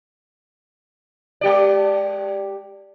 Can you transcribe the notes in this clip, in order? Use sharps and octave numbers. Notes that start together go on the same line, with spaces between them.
G#3 G4 D5